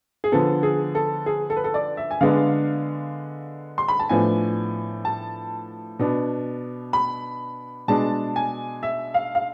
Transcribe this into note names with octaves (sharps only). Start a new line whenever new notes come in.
G#4
D3 F3 B3 A4
G#4
A4
G#4
A4
B4
A4
D5
E5
G#5
D3 G#3 B3 D4 F5
C6
B5
A5
A2 F3 B3 D4 G#5
A5
B2 B3 D4
B5
B2 G#3 D4 A5
G#5
E5
F5
F5